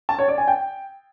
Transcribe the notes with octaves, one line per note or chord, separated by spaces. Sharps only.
A5
C#5
D5
G#5
G5